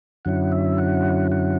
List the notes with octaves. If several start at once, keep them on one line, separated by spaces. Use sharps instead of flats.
F#2 D3 F#3 C#4 E4 F#5
E5
F#5
F#5